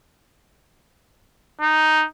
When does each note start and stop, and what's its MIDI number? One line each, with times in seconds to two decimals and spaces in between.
1.61 2.06 63